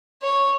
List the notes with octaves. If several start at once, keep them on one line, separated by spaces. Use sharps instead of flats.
C#5